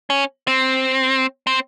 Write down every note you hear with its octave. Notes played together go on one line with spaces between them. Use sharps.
C#4
C4
C4